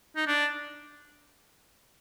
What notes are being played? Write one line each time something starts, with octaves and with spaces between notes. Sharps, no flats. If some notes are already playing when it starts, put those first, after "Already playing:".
D#4
D4